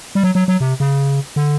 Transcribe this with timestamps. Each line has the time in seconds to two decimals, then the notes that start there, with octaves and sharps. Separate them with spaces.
0.15 G3
0.24 F#3
0.35 F#3
0.48 F#3
0.61 C3
0.80 C#3
1.36 D3